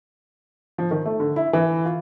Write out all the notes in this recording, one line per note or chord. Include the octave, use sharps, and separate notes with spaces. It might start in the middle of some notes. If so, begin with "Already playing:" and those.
F3
D#3
A3
D3
E4
E3
F4